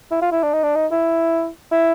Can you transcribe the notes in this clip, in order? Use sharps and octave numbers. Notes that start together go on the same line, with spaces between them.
E4
F4
E4
D4
D#4
D4
D#4
E4
E4